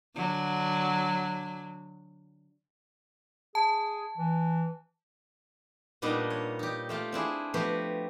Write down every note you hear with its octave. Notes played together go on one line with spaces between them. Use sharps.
D3 F#3
G#4 A5
E3
A#2 G3 B3 D4 D#4 D#5
C#5
D#4 G4
A3 F4 G4
C4 D4 E4 G#4
F3 A3 B3 F#4 G4 B4